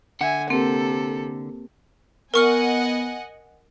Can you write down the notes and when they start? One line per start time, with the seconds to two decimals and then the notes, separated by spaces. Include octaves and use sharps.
0.21 D3 E5 F#5 G#5
0.50 C3 A#3 C4 A4 A#4
2.34 B3 A#4 D#5 F#5 G#5 C#6 F6